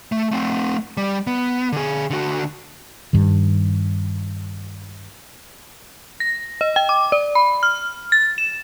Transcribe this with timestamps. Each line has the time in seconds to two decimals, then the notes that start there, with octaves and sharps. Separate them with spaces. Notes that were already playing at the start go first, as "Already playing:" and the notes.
0.12 A3
0.31 A3 C4
0.97 G3
1.27 B3
1.72 D3 G#4
2.10 D3 F#4
3.13 G2 D#3
6.20 A#6
6.61 D#5
6.76 G5
6.89 D6
7.12 D5
7.35 B5
7.63 F6
8.12 A6
8.38 E7